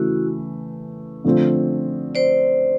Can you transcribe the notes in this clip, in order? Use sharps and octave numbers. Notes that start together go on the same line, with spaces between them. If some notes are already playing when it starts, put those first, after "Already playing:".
Already playing: C#3 E3 A3 E4 F#4
D3 F3 A3 C4 F4
C5 D5